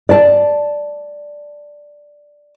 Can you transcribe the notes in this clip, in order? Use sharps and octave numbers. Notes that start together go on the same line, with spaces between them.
D5 A5